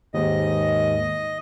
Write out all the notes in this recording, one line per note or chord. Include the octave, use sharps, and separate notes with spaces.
D#2 G#2 D#5